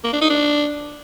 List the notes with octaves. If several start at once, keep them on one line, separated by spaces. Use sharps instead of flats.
A#3
D4
D#4
D4